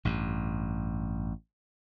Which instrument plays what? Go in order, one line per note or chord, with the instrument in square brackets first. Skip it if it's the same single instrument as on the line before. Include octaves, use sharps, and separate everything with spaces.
[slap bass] A1 G2